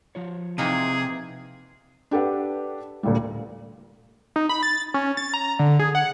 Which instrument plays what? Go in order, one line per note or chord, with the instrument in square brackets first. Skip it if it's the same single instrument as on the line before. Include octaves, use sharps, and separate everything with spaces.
[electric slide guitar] F3 F4 C#5
[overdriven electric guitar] C3 [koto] E3 A#3 D#4 [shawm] G#4
[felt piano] D4 G4 A4 B4 F#5
D2 A#2 G3
[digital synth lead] D#4
B5
A6
C#4
A6
A#5
D3
G#4
F#5